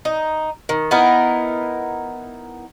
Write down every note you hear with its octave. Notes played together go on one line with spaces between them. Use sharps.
D#4
D#3
B3 D#4 E4 A#4